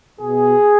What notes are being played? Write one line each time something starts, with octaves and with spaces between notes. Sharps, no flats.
B2 G#4